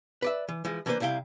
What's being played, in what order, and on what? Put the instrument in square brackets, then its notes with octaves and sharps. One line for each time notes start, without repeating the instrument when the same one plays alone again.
[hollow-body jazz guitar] B4 D5 E5
E3
E3 F3 G#3
E3 A#3 B3 D4 B4 C5
C2 C3 E4 F5 G5